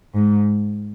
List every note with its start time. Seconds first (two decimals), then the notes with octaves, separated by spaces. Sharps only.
0.14 G#2